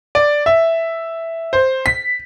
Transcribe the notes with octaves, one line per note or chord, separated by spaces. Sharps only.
D5
E5
C5
B6